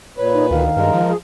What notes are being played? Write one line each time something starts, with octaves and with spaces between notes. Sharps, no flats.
A#2 B4 C#5
D#4
D2 D#3 F5
G2 G#3 A#4
F3
G#4